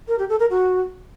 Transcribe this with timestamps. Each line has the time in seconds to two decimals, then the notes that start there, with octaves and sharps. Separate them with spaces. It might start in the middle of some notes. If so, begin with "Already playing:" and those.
0.08 A#4
0.19 G4
0.29 A4
0.40 A#4
0.50 F#4